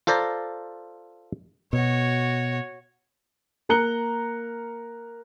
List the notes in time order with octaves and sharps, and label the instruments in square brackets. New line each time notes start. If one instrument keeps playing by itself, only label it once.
[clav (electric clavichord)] F4 A4 C5 D5 A#5
[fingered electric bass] B2 [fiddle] F#4 C#5
[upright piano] A#3 A#4 A#5 F#6 C#7 G7